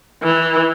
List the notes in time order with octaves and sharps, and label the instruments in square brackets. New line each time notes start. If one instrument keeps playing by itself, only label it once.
[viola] E3